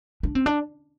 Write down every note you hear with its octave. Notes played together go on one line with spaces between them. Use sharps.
D4
C4
D4